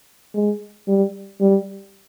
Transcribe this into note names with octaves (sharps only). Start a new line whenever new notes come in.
G#3
G3
G3